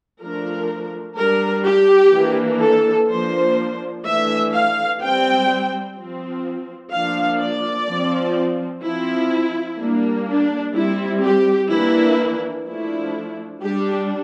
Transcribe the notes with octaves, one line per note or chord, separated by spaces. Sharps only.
F3 A3 D4 A#4
G3 D4 A#4
G4
E3 A#3 D4
A4
F3 A#3 D4 C5
E3 A3 D4 E5
F5
G3 C4 G5
F3 C4
F3 A#3 D4 F5
D5
F3 C4
F3 C4 E4
G3 A#3 D4
D4
G3 C4 E4
G4
E3 A#3 D4 E4
F3 A3 D4 E4
G3 D4 G4